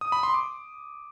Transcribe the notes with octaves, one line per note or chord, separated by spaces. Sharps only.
D#6
B5
C6
D6